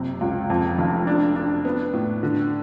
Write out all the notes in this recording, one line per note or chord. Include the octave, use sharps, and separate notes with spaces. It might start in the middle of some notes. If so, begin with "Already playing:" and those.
Already playing: F#1 C3
C#2
F2
F1
D4
D4
B3
A2
D3